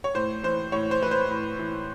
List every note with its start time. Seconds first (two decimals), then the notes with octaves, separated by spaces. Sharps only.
0.04 C#5
0.14 A2 C5
0.43 E3 C5
0.72 A2 C#5
0.91 C5
1.02 E3 B4
1.11 C5
1.30 A2
1.59 E3